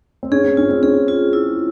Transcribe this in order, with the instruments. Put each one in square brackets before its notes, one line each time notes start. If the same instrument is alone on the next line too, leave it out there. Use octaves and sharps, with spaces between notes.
[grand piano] C4
[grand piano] C#4 [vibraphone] G#4
[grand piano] C4
[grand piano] C#4 [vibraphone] F4
[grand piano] C4
[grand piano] C#4 [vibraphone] G#4
[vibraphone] F4
E4